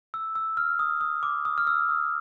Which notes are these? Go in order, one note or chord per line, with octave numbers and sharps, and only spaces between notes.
E6
E6
F6
D#6
D#6
D6
D#6
F6
E6
D#6